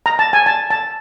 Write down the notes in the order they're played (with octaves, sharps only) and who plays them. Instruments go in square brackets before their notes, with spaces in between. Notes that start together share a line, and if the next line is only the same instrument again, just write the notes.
[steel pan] A#5
A5
G#5
A5
A5